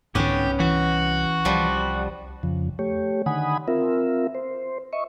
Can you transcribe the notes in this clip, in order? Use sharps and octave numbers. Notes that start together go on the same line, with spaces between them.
C2 G#2 D3 B3 C#4 G4
E3 F#4
C2 F3 G3
F2 C#3 F3
A3 G4 C#5
D3 D#3 F#5 G#5 B5 D#6
C4 F4 A#4 E5
C5
D#5 E5 C#6